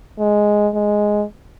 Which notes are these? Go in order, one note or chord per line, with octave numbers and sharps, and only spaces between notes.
G#3
G#3